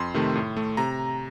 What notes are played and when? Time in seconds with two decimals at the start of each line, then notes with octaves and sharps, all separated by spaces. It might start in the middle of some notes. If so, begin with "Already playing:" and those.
Already playing: F2 C6
0.14 C3 D#3 A3
0.35 A2
0.57 A3
0.77 C3 A#5